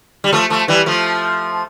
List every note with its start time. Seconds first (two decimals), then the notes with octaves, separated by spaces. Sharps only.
0.24 G3
0.32 F3 A3
0.50 F3 A3
0.68 E3 G3
0.86 F3 A3